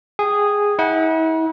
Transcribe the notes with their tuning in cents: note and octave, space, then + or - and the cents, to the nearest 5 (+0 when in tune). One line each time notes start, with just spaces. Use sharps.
G#4 -10 G5 -5
E4 -45 F#5 +0